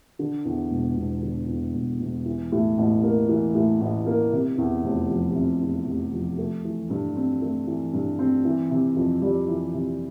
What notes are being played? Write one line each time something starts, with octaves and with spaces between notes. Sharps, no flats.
D3
E2
E1
E1
D3
E2
E1
E1
E3
A2
A1
A#3
E3
A2
A1
A#3
C3
E2
F1
F3
C3
E2
F1
F3
A3
E3
G2
C4
A3
E3
G2
C4
E3
C3
F2
G3
E3
C3